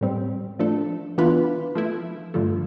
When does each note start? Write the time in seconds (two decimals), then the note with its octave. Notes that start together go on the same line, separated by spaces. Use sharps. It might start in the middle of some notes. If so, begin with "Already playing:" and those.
0.01 A2 G3 C4
0.59 F3 A3 D4 A4
1.18 E3 B3 D4 F4 B4
1.75 F3 A3 E4
2.34 G2 D3 F3 A3